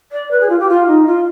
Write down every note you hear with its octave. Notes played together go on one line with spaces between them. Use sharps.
D5
B4
G#4
F4
G4
F4
D#4
F4